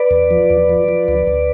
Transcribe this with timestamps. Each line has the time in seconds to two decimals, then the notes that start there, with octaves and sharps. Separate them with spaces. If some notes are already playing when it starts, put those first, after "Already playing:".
Already playing: B4 D5
0.11 E2
0.31 F3
0.50 E2
0.69 F3
0.88 F3
1.08 D2
1.27 D2